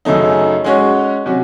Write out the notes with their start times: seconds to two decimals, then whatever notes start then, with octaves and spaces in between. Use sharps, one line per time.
0.05 F#2 C#3 F#3 A3 D#4
0.64 G#3 C#4 F#4 C#5
1.26 C3 F#3 C#4 F#4